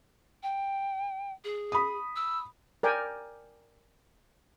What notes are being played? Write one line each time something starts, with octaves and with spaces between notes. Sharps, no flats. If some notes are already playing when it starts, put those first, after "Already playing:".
G5
G#4
B5 D#6
E6
A#4 D5 G5 G#5